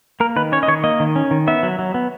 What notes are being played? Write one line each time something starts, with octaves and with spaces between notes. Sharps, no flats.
A#3 A#4
D#3 B4
C#4 C#5
D#5
D#3 C#5
A#3 D#5
D#3
C#4
D#3
B3 E5
F#3
F#3
B3